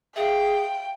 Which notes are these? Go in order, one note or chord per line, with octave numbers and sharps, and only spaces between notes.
G#4 E5 F5 G5